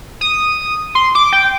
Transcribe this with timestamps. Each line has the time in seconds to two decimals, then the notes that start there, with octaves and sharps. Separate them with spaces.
0.21 D#6
0.95 C6
1.15 D6
1.33 G5